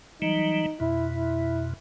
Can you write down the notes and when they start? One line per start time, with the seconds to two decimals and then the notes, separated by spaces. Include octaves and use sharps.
0.22 E3 F#3 G3 D#4
0.80 F2 B2 E4
1.13 E4